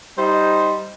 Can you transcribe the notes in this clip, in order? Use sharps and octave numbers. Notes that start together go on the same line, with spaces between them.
G3 D#4 C5